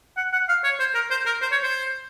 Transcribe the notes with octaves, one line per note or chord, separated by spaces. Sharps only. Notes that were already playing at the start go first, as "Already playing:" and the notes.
F#5
F#5
F5
C#5
C5
A#4
C5
A#4
C5
C#5
C5